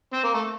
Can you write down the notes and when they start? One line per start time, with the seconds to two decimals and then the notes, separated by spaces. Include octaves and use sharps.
0.13 C4
0.24 A#3
0.34 A3